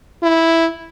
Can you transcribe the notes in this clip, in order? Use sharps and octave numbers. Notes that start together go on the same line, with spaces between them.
E4